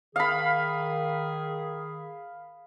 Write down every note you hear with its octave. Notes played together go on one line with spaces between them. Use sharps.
D#3 G#4 F5 B5